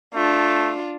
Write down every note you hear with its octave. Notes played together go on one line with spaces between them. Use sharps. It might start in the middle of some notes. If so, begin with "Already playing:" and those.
A3 D4 F4